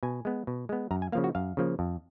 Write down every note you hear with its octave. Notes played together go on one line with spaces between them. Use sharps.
B2 G#5
G#3 B3
B2
G#3 B3
F#2 A#5
G#5
C#3 F3 A#3 F5
F#4
F#2 F5
C#3 F3 A#3
F2